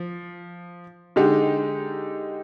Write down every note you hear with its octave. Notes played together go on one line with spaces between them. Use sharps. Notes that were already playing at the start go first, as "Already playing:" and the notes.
Already playing: F3
D3 G#3 D#4 G4